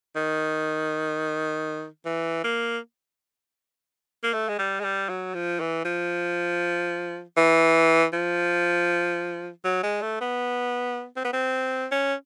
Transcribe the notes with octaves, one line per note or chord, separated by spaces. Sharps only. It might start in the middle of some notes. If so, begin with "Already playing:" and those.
D#3
E3
A#3
A#3
A3
G#3
G3
G#3
G3
F#3
F3
E3
F3
E3
F3
F#3
G#3
A3
B3
C4
B3
C4
C#4